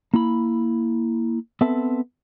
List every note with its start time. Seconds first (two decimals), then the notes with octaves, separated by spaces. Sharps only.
0.14 A#3 E4 B5
1.61 B3 C4 A4 B4 E5 A5